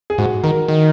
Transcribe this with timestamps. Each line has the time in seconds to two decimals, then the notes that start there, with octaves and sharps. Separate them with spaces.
0.10 G#4
0.18 G#2 F#4
0.43 D#3 A#4
0.68 D#3